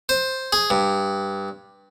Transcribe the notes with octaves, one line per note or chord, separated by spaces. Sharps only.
C5
G#4
G2